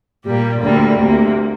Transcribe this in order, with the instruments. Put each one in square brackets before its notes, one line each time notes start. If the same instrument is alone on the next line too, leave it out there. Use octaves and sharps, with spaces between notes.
[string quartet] A#2 G3 A#3 G4
D2 D3 G3 A#3
D2 C3 A#3